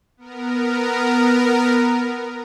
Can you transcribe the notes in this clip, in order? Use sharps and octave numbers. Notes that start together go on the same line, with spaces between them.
B3 A#4